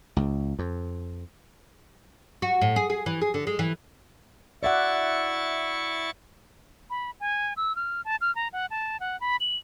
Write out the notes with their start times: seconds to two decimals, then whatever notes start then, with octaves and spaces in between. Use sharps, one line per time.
0.17 C#2
0.59 F2
2.42 F#4
2.61 A2
2.76 G#4
2.90 G#4
3.06 E3
3.21 G#4
3.34 D3
3.47 G#3
3.59 E3
4.63 E4 D5 E5 F#5 C#6 A6
6.90 B5
7.20 G#5
7.57 E6
7.76 F6
8.05 A5
8.21 F6
8.35 A#5
8.53 F#5
8.71 A5
9.00 F#5
9.21 B5
9.40 F#7